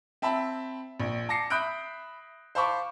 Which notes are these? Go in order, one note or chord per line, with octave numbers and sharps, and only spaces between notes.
C4 E5 A5 B5
A#1
A5 D6 A#6 C7 C#7
E5 B5 D#6 F#6 G6 D7
C5 F5 A5 B5 C#6 D6